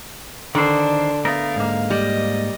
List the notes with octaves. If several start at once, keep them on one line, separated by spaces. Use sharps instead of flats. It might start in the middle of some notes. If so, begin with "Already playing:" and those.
D3 D#3 D4 C5
A3 B3 A#4 F5
G#2 A#3
G3 D#5